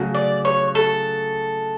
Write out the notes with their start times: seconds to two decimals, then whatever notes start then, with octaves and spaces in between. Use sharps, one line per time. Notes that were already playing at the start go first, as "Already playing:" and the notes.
Already playing: C#3 F#3 A3 C#4 F#4
0.15 D5
0.45 C#5
0.75 A4